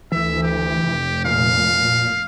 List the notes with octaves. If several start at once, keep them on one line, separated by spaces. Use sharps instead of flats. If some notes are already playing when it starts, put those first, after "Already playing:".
D2 E3 E5
G4
F1
A#2 F5